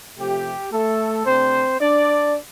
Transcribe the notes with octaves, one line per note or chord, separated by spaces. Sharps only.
C3 F3 A3 G4
A3 A4
C3 A3 C4 D4 C5
D4 D5